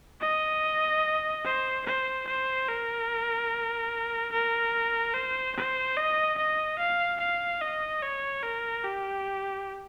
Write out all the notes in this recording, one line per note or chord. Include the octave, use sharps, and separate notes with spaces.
D#5
C5
C5
C5
A#4
A#4
C5
C5
D#5
D#5
F5
F5
D#5
C#5
A#4
G4